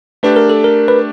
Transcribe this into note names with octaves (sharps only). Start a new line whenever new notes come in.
A3 D4 G4 B4
A#4
A4
A#4
B4